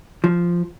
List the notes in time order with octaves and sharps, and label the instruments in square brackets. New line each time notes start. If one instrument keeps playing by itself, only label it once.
[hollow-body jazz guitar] F3